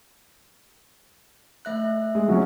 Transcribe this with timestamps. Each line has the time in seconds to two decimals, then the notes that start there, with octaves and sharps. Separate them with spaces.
1.65 A3 E5 F#6
2.15 G#3
2.28 F#3 C#4